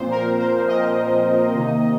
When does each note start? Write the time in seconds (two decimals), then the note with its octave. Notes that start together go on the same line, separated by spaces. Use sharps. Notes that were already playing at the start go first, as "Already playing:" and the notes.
Already playing: A#2 F3 C4 C5
0.11 A#4
0.39 C5
0.68 A#2 F3 C4 D#5
1.55 C3 D#3 A#3 D#4